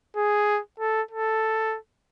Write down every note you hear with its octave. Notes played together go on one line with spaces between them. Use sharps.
G#4
A4
A4